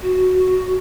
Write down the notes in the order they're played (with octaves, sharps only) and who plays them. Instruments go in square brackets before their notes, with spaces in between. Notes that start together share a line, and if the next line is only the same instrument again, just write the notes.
[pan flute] F#4